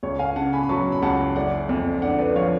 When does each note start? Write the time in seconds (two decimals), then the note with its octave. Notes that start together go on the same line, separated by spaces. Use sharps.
0.03 C#2 C#5
0.19 F5 G#5
0.36 C#3 F#5 A5
0.53 G#5 B5
0.63 B5
0.69 F#3 A5 C#6
0.92 B5
1.02 C#2 F#5 A5
1.36 F#1 D5 F#5
1.69 F2
2.02 D3 D5 F#5
2.19 B4 D5
2.35 F3 C#5 F5